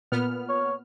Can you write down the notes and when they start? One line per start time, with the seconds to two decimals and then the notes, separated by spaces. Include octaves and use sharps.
0.12 A#2 B3 F6
0.49 C#5